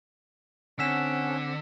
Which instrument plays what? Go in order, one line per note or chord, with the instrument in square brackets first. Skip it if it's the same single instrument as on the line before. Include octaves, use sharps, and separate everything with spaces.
[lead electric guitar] D3 [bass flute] C4 [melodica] C#4 F#5 [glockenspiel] E6 B6 E7